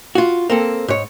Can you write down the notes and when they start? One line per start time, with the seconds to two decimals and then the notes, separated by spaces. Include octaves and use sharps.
0.15 F4 F#4
0.50 A#3 C4 A4
0.88 G#2 C#5